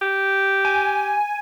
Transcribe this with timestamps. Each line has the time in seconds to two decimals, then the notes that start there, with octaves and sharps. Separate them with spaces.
0.02 G4
0.65 G#5